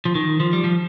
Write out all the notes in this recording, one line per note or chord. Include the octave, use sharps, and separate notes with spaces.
F3
D#3
F3
G3
F3